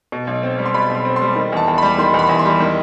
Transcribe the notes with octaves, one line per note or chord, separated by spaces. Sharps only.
B2
B1
C4
G3
C6
B2 B5
B1
C6
C4
C6
G3
D#3
E2 A5
E2
G3 B5
D#3 C6
E2
B5
E2
C6
G3
D#3